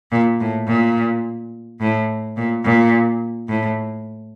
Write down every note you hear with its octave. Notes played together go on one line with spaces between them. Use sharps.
A#2
A2
A#2
A2
A#2
A#2
A2